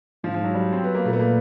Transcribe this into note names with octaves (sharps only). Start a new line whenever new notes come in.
G#2 F3
F3
F#3
G3
C4
B3
A#3
A#2 A3
B3
A#3